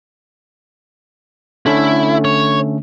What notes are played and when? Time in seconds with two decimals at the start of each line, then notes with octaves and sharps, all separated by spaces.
1.66 D3 A3 C#4 E4
2.25 C#5